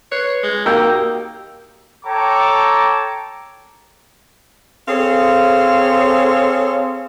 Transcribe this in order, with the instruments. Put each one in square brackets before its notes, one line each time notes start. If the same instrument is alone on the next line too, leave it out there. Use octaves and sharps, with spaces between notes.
[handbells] B4 F#6 C7 [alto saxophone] C#5
[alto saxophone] G#3
[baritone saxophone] A#3 [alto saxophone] D#4 [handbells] F#4 G4 [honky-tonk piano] G5 E6 G6
[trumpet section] A4 C#5 G5 A5 A#5 D6
[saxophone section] C4 G#4 A4 C5 C#5 F5